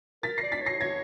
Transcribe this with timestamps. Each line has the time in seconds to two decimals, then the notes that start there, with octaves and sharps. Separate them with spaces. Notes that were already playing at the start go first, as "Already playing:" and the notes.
0.23 A#4 A6 B6
0.38 A#6 C7
0.43 D5
0.52 A6 B6
0.62 C#5 A#6 C7
0.80 C#5 G#6 A#6